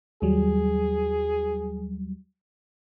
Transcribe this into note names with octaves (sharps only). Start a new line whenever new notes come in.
D#2 F#3 G3 G#4